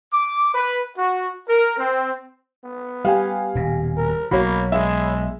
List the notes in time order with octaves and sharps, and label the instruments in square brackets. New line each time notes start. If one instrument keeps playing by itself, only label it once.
[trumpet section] D6
B4
F#4
A#4
C4
[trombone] B3
[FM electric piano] G3 G4 G#5 [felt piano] F5
[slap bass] D#1 B2
[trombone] A#4
[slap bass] B1 B2 [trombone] A#3 [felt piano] F#4 [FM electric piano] C#5 B5
[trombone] G#3 [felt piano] E5